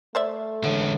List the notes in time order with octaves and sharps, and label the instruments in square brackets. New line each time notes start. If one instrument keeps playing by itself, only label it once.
[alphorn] A3 [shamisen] C5 D5 E5
[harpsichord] A1 [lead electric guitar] D3 G#3